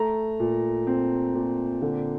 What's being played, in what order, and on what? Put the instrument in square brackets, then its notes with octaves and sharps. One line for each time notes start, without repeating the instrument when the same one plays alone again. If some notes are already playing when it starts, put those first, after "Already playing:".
Already playing: [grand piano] A3 A#5
A#2
C4
A#2
D3